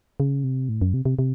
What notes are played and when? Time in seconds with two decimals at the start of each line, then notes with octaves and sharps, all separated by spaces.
0.20 C#3
0.44 C3
0.69 A2
0.81 F#2
0.94 C3
1.05 C3
1.19 C3